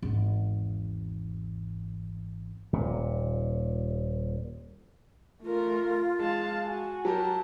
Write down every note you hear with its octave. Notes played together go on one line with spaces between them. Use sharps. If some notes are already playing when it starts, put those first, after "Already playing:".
G#1 E2
D#1 A#2
A3 F4 A#4
G#3 F5 A5
F#4 G#5
F#3 G4 A#4 A5